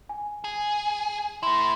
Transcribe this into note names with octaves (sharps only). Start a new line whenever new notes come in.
G#5
G#4
A3 E4 C6